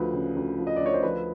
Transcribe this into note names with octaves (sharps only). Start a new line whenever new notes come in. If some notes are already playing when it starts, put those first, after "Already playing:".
Already playing: D2 F3 B4
C#3
D2
F3
D#5
D5
D2 C#5
C5
F3 B4